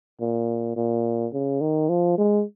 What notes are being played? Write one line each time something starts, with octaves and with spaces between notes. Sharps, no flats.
A#2
A#2
C#3
D#3
F3
G#3